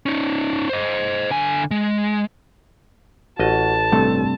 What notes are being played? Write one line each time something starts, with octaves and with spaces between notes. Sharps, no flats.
C#4 D#4
C5 D#5
D3 G#5
G#3
A1 F#4 D#5 A5
G2 C3 A3 A4